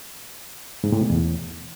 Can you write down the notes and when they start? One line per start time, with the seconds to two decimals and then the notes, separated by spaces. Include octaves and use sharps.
0.84 G#2
0.92 A2
1.01 B2
1.10 E2